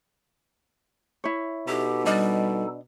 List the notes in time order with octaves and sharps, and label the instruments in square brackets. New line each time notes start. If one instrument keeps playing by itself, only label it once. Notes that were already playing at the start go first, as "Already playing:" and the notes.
[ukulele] E4 C#5
[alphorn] B2 [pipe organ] D#4 A4 [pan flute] G4
[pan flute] G3 [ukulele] D4 D#5